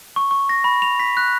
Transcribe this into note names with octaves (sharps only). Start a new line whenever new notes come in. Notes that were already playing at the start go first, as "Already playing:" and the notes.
C#6
C#6
A#6
B5
F7
B6
F#6